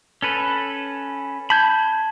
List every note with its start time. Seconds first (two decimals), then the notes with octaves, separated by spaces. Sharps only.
0.22 C#4 A4 B4
1.50 A5 B5 G6 G#6